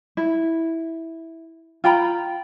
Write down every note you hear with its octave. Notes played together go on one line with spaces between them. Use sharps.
E4
F4 G5 A#5 B5